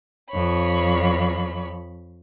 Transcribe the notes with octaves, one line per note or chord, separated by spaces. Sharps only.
F2 C#5 B5